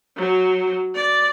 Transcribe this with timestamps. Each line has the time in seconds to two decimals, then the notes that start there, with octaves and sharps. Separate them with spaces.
0.17 F#3
0.95 D5